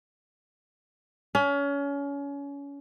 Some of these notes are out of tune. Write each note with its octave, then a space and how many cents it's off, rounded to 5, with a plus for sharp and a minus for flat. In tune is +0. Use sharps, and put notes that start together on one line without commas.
C#4 +30